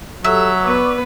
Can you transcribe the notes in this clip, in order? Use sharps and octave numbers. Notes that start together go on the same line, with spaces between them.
F#3 G4 A4 E5
B3 B4 D5 C#6 D6